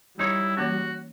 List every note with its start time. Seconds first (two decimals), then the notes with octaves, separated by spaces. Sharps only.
0.19 G3 D#4 E4 C#5
0.57 E3 A#3 C#4 F#4